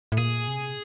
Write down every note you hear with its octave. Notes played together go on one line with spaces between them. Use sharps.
A2
A#2 G#4
C3